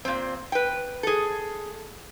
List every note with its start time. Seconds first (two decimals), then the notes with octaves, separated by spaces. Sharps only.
0.05 A#2 C4
0.52 B4 G5
1.03 G#4 A4